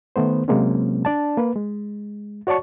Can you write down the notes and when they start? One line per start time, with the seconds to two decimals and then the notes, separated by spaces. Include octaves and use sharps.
0.16 D#3 A3 B3 C5
0.48 C3 F#3 G#3 A#3 C4 C#4
1.05 D4 D5 A5
1.37 A#3 B4
1.55 G#3
2.47 F#4 C#5 D5 A5 C#6